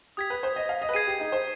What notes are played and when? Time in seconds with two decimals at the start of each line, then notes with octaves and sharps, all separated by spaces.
0.17 G4 D#6 G#6 B6
0.30 B4
0.43 C5
0.56 D#5
0.69 F5
0.82 D#5
0.89 B4
0.94 G#4 G#6 C7 D#7
1.07 G4
1.20 D#4
1.32 C5